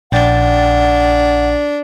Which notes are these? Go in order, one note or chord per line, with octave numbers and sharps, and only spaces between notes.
A#1 D4 F#5 G5 A6